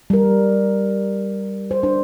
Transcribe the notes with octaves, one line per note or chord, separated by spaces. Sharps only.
G3 A#4
C5
D4 C5